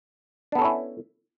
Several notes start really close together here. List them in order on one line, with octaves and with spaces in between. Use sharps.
D4 B3 A4 C#4 E4